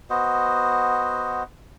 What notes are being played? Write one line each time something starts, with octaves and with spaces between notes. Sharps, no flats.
B3 F#4 C5 D#5